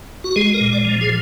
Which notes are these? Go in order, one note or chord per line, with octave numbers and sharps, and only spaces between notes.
F#4
G#3 G#4
A#4
A#2
D5
F3
G#4